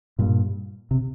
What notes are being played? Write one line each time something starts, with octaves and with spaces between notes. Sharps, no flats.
G2 A#2
C3